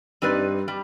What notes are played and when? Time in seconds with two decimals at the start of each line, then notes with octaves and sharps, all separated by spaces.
0.22 G2 G3 C4 D#4 B4 D5
0.68 G3